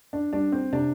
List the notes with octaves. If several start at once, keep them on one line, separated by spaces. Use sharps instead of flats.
D4
G3 D4
C4
C3 D4